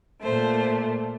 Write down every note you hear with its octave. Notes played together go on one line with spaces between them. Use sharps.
A#2 A3 C5